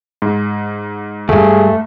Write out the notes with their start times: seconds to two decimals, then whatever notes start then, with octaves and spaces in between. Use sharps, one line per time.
0.22 G#2
1.29 D2 G2 A3 G#4